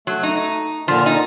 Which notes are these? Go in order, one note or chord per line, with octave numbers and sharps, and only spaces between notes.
F#3 A3
D#4
A#2 D3 F3 F6
D#4